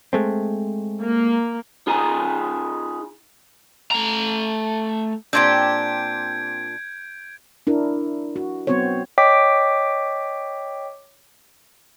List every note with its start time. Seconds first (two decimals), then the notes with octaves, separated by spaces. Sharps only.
0.13 G#3 A3 C4
1.00 A#3
1.87 D#4 F4 G#4 G#5 A#5
3.91 A3 A#5
5.33 A#2 C4 D4 F4 G4 G6 G#6 D7
7.67 D4 E4 A#4
8.36 F#4
8.67 F#3 B3 C4 F#4 C5 C#5
9.18 C#5 D#5 G5 D6 B6